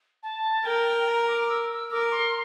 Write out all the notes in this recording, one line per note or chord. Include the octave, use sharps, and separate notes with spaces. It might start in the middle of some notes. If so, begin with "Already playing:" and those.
A5
A#4 G5
A#5
D6
E6
E6
A#4 D6
C6